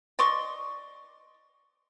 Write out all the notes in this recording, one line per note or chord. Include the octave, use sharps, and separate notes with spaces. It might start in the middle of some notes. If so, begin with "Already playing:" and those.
D5 D#5 C6 C#6